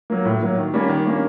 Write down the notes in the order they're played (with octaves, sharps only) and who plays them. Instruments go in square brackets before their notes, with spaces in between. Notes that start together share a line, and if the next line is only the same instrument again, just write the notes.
[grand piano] F#3 A#3
A2
F#3 A#3
D#3
G3 A#3 C#4
D#3
G3 A#3 C#4